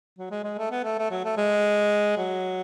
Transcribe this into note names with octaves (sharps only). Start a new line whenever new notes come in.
F#3
G#3
G#3
A3
B3
A3
A3
F#3
A3
G#3
F#3